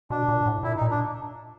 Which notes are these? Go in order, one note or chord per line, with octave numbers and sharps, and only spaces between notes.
B2 D4
A#2
A2
A#2 E4
D#4
A#2
D4